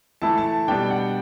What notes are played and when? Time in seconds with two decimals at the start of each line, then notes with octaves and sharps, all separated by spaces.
0.22 E3 A3 E4 A5
0.38 A5
0.68 B2 G3 B3 D4 G5
0.90 F#5